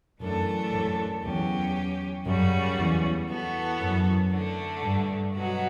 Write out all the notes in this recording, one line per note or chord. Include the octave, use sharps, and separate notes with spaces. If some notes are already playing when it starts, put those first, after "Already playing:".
F#2 E3 A3 D4 A4
F#2
E2 F#3 C#4 G4
F#2 C#3 G3 C#4 F#4
E2
E3 B3 F#4 A4
F#2
D3 A3 D4
G2
B2 F#3 B3 F#4